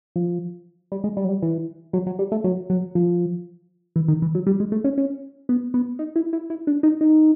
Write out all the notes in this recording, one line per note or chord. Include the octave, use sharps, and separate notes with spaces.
F3
G3
G#3
G3
F#3
G3
E3
F#3
F#3
G3
A3
F#3
F#3
F3
E3
D#3
E3
F#3
G3
G#3
A3
C#4
C#4
B3
B3
D#4
E4
E4
E4
D4
D#4
D#4